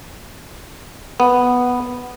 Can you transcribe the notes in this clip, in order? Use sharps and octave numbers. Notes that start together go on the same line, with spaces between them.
B3